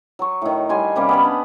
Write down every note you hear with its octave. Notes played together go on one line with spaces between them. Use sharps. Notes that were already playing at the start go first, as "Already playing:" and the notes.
F#3 C#6
A2 D#3
G3 F#4 G#5 C6
C3 G3 A#3 C#4
B3 C#4 B5
D4 B5